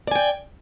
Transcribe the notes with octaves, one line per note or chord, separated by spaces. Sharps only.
D5 G5 G#5